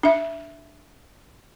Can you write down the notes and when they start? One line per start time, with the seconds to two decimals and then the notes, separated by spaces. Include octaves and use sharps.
0.03 D4 E5